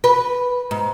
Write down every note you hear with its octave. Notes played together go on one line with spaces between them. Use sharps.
B4
G#2